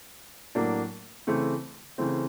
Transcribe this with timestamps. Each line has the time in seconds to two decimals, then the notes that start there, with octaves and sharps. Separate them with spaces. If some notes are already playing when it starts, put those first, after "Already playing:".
0.55 A2 F#3 A#3 D4
1.27 C#3 E3 A3 C4
1.98 C#3 E3 A3 C4